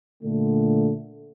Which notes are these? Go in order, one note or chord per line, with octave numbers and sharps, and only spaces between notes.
A#2 D3 A3